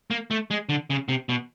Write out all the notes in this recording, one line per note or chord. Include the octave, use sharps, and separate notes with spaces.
A#3
A3
G#3
D3
C#3
C3
B2